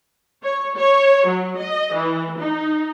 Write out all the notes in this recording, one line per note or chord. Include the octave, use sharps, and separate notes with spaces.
C#5
C#5
F#3
D#5
E3
D#4